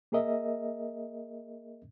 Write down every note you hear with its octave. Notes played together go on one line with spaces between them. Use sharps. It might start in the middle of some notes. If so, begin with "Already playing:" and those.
A#3 G#4 A#4 D#5 E5